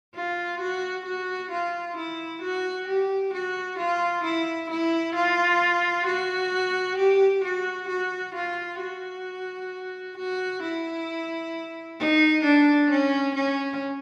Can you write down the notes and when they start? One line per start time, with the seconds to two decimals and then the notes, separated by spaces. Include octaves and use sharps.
0.15 F4
0.60 F#4
1.06 F#4
1.51 F4
1.97 E4
2.42 F#4
2.88 G4
3.33 F#4
3.79 F4
4.24 E4
4.70 E4
5.15 F4
6.07 F#4
6.98 G4
7.44 F#4
7.89 F#4
8.35 F4
8.80 F#4
10.17 F#4
10.63 E4
11.99 D#4
12.44 D4
12.90 C#4
13.35 C#4